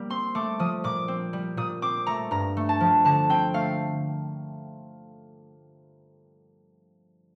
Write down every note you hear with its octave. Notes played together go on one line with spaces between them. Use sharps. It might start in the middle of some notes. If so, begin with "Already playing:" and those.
Already playing: G3 A#3
C4 C6
A3 D6
F3 D#6
A#2 D6
C4
G3
A#2 D#6
C4 D6
A3 A#5
G2 A#5
A3
A5
F3
D3 A5
C4 G5
A3 F5